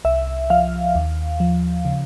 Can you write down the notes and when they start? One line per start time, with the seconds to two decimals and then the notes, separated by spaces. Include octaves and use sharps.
0.05 C2 E5
0.50 F3 F5
0.95 D#2
1.40 F3
1.85 C#3